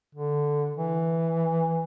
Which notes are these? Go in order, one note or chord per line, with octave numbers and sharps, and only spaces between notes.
D3
E3